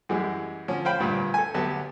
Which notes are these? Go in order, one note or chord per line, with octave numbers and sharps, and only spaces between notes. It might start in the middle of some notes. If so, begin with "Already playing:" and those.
F#2 E3 G3 G#3
D3 F3 C#4
C5 F5 G5 B5
D2 G2 A#2
A4 G#5
D2 F#3 B3 F#4 G4 A5